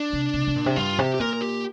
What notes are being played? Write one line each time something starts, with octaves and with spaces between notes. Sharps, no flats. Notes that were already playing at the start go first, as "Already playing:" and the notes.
Already playing: D4
C3
C3
C3
A#2
C3
G2 F4
C3 G4
G4
A#2 A#4
A#4
G4